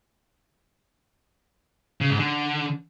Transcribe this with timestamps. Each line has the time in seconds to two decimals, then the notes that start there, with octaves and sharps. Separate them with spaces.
2.01 C#3
2.10 G#2
2.19 D3